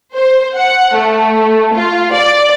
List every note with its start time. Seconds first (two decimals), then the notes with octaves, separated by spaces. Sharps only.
0.15 C5
0.57 F#5
0.95 A3
1.74 F4
2.12 D5